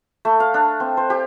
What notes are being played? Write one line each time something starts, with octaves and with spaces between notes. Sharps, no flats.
A3
F5
D4
C4
C5
G4